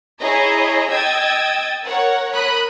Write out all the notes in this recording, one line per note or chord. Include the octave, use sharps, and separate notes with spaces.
E4 G#4 C#5 D#5 A#5
D#5 G5 D#6 E6 G#6 A6
A#4 C#5 F#5
A#4 B5 D#6 F#6